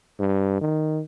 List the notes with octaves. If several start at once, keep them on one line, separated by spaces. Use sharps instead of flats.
G2
D#3